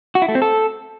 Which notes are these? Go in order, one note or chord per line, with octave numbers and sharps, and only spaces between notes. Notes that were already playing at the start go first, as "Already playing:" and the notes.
F#4
E4
A3
C4
A4